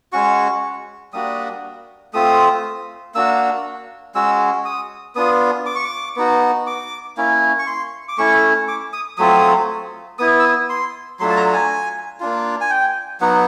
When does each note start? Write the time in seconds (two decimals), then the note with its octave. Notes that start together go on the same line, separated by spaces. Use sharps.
0.13 G#3 C#4 F#4 C#6
1.13 G3 A#3 D4 F#4 D#6
2.14 A3 C4 F4 D#6
3.15 A#3 D4 F#4 E6
4.15 G#3 C#4 F#4 E6
4.65 D#6
5.15 B3 D4 F4 D#6
5.66 D6
5.75 C#6
5.84 D6
6.16 B3 D#4 F#4
6.67 D6
7.17 A#3 C#4 E4
7.59 C#6
7.67 C6
8.09 D6
8.18 A3 C#4 E4 C#6
8.68 D6
8.93 D#6
9.18 F#3 A3 C4 F4 D#6
10.19 B3 E4 D#6
10.39 E6
10.44 D#6
10.69 C6
11.20 F#3 A3 D4 F4 C6
11.30 A5
11.37 A#5
11.53 G#5
12.20 A#3 D4 F4
12.61 G#5
12.70 G5
13.21 F#3 B3 D#4 F#5